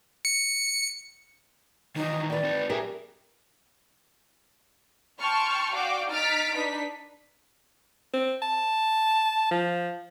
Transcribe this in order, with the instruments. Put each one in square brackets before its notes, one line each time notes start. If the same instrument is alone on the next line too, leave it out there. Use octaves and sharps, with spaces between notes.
[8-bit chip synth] C#7
[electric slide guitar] D#3 E3 F#3 [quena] D#4
[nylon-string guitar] B4 G5 [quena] D5
[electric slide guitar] C4 D#4
[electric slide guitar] F#3 E5 G#5 [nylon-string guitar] G4 G#4 A#4
[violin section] G5 A5 C6 C#6 F6
F#4 D5 F5 G5 D6
D#4 F6 A6 B6 D7
D4 D#4 B4 B6
[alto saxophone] C4
A5
F3